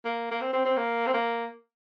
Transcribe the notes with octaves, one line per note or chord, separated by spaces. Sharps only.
A#3
A#3
C4
C4
C4
A#3
C4
A#3